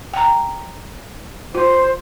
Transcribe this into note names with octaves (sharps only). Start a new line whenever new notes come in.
G5 A#5
F4 C5